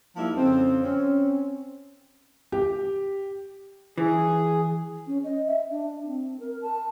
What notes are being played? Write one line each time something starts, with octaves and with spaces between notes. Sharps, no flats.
F3 G3 A#3 D#4 E4
F2 C#3 C4
C4 C#4
G4
E3 G#4
C#4
D#5
E5
D4
C4
A#4
A5